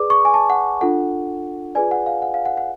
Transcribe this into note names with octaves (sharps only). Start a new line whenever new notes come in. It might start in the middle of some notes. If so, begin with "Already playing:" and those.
Already playing: G#4 B4 D5 D6
C#6
G#5
A5
F#5
D4 F4 A4 F#5
F4 G#4 B4 D5 G#5
F#5
F5
F#5
F5
F#5
F#5